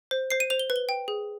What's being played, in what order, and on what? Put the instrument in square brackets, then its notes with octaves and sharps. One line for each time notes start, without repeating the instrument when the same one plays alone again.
[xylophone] C5
C5 C7
D#7
C5 F7
G7
B4
G7
G5
G#4